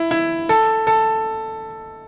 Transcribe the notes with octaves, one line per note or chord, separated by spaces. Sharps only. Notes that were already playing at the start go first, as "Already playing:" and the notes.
Already playing: E4
E4
A4
A4